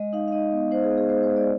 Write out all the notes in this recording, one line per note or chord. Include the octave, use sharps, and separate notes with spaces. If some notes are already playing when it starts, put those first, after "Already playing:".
Already playing: G#3 D#5
D#4 F5
F5
D#4 D#5
B3
D#4 C5
G#4
B3
G#4
G#3 C5
C5
G#3
D5